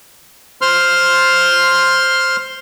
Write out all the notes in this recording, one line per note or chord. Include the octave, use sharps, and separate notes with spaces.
C5 C6 F6